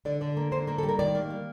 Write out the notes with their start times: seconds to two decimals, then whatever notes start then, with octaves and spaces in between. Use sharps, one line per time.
0.05 D3 D5
0.21 D3 D5
0.37 A#3
0.52 D3 C5
0.67 A#3 A#4
0.78 A4
0.83 G3
0.89 A#4
0.99 D#3 D5
1.15 A#3
1.30 G3